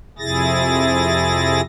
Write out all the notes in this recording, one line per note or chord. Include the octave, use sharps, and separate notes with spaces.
F2 C3 E4 G#4 A6 A#6